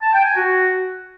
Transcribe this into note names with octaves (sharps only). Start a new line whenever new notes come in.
A5
G5
G#5
F#4